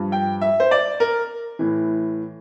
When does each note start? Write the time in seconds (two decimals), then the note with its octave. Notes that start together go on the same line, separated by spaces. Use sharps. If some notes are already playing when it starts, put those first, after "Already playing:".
Already playing: G2 F3
0.12 G5
0.41 E5
0.60 C5
0.71 D5
1.00 A#4
1.59 A2 E3